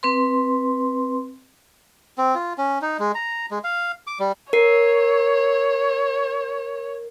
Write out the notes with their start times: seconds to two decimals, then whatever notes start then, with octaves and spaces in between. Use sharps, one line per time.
0.03 C4 B4 C6
2.18 C4
2.35 F4
2.58 C#4
2.82 D#4
2.99 G#3
3.15 A#5
3.51 G#3
3.64 F5
4.07 D6
4.20 G3
4.53 A#4 C#5 C7